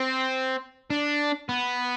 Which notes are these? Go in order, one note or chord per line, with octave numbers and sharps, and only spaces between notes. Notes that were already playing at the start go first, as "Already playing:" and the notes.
Already playing: C4
D4
B3